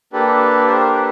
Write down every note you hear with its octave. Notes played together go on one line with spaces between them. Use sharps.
A#3 D4 G4 A4 B4
A#4 C5
A4 B4